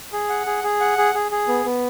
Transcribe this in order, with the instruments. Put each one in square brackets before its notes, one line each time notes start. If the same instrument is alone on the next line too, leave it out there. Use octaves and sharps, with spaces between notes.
[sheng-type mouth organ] G#4
F#5
G#4
G#4
F#5
G#4
G#4
G#4
B3
B3